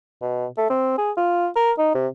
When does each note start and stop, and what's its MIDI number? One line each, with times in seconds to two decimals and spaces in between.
0.22 0.46 47
0.57 0.67 57
0.70 0.94 60
0.98 1.11 68
1.17 1.48 65
1.55 1.72 70
1.78 1.93 63
1.95 2.07 48